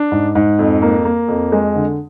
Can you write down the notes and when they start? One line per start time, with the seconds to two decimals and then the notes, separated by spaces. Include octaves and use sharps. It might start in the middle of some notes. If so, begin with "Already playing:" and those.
Already playing: D4
0.12 G#2
0.35 G#2
0.59 F2
0.82 A#3
1.05 A#3
1.28 F2
1.52 G#3
1.75 D3